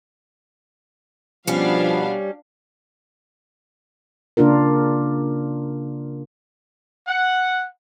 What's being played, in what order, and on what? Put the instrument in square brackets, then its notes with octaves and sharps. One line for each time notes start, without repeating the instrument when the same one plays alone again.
[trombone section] B2 B3 [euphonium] F3 [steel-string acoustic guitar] G3 C#4 [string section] D4 F5
[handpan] C#3 A#3 D4 F4 A#4
[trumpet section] F#5